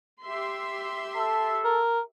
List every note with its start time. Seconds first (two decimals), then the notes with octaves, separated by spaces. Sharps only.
0.23 G4 E5 C6
1.16 A4
1.65 A#4